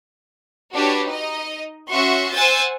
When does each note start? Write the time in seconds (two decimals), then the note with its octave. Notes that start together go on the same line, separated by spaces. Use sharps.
0.73 D4 F#4 G4 B4 C#5
1.06 D#4 D#5
1.89 C#4 F#4 E5 C6 C#6
2.32 C5 F#5 G#5 E6 G6 A6